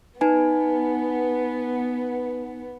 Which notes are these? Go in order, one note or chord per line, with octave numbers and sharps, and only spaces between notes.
B3 D#4 B4 G#5